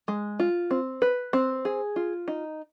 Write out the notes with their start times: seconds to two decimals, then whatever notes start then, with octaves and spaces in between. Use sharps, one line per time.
0.08 G#3
0.40 F4
0.71 C4
1.02 B4
1.33 C4
1.65 G#4
1.96 F4
2.28 D#4